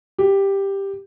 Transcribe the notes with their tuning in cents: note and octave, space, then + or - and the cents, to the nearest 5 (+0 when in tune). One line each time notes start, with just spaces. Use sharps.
G4 +5